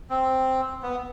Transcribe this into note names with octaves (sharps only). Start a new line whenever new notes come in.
C4
B3